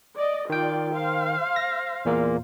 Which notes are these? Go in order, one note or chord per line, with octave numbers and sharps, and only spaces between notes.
D5 D#5
D#3 F4 D5 G5
C5 F5
A#6
E2 A#2 A#3